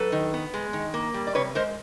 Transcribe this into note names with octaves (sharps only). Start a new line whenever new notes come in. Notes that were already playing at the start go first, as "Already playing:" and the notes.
Already playing: F#3 A4 B4
D#3
B3
G#3
D#3
A#3
G3
D5
C3 B4 C#5
G#3 A#4 C5